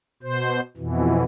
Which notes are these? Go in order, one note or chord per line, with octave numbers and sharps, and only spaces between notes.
B2 C5
F2 B2 E3